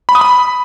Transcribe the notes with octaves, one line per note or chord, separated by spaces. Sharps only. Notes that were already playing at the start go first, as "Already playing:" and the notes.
B5
D#6
B5